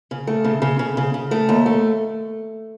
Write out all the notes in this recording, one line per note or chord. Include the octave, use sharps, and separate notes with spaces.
C#3
A3
C#3
C#3
C#3
C#3
C#3
A3
D#2
A3